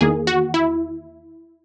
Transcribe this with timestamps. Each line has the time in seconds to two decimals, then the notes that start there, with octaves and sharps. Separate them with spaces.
0.01 E2 D#3 A#3 G#4
0.27 F#4
0.54 E4